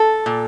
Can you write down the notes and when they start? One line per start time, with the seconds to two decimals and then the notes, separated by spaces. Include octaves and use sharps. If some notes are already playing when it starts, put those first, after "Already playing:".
Already playing: A4
0.26 A#2